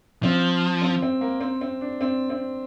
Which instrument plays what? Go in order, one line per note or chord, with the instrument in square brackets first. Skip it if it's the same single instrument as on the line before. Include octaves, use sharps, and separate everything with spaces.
[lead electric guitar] F3 [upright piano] C4
[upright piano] C4
C4
A#3
C4
C4
D4
C4
C4